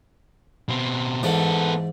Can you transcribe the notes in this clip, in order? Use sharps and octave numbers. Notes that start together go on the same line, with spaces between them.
B2 C4
G#2 E3 B3 A4 D5